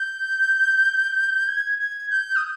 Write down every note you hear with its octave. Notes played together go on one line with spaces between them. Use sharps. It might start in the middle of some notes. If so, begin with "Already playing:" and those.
Already playing: G6
G#6
G#6
G6
D#6